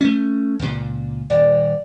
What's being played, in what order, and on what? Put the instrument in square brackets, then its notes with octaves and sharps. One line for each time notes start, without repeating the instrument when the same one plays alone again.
[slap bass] A3 C#4
C#2 A#2
[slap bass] D#1 [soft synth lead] D5